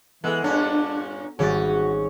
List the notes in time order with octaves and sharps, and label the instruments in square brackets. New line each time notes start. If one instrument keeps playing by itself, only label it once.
[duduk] E3 [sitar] G#3 [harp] B3 A4
[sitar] G2 A#2 C#4 [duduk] D4
[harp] G#1 G3 A6 [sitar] C#4 [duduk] F#4